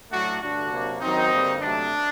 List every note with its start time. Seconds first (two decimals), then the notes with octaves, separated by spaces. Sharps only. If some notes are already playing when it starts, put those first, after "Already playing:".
0.11 A2 F#3 A3 D4 F#4
0.41 G2 D3 A3 D4 F#4
0.71 C3 F#3 A#3
1.01 F#2 D#3 F#3 C4 D#4
1.31 G2 D3 G3 A#3
1.61 C3 F#3 A3 D4